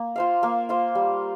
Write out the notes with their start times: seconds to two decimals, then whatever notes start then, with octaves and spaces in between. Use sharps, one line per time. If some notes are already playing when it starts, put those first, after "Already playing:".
Already playing: A#3
0.16 F4 C5 F5
0.43 A#3
0.69 F4 C5 F5
0.95 G3